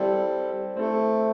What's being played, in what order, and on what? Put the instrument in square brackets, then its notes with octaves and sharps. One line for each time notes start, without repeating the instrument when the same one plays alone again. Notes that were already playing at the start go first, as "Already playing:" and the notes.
Already playing: [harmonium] G3 [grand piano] C4 E4 A4
[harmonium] A3 [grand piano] C4 E4 A4